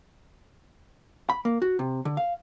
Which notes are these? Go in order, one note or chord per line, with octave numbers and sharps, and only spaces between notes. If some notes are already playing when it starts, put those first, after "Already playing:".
B5
A#3
F#4
C3
D3
F5